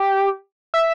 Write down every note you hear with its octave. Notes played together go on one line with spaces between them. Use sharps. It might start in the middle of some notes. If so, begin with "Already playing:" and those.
Already playing: G4
E5